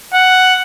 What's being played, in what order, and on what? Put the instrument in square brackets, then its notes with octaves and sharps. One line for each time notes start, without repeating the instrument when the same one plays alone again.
[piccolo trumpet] F#5